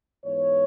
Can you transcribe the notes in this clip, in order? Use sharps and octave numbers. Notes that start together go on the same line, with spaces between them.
G#2 E3 B3 C#5